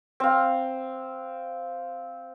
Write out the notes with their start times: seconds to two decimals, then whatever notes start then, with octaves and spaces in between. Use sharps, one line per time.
0.20 C4 F5